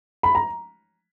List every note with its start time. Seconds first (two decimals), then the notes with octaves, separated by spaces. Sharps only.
0.23 B5
0.35 A#5